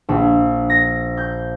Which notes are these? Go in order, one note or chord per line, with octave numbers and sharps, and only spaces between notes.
A#1
A#6
G6